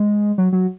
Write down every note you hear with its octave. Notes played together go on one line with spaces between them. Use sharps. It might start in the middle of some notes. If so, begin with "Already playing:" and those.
Already playing: G#3
F#3
F#3